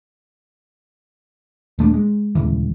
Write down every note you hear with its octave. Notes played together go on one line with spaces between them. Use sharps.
D#1 A3 A#3 D4
G#3
D#1 C#2 E3